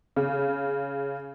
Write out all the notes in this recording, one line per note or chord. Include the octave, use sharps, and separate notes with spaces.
C#3